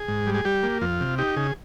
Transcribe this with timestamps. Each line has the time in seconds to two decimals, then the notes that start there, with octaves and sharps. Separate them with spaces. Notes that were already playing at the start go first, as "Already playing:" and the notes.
Already playing: G#4
0.08 G#2
0.27 G3
0.34 G#4
0.45 G3 G4
0.63 A#3
0.81 F2 F4
1.01 C3
1.18 D#4 G4
1.36 C#3 G#4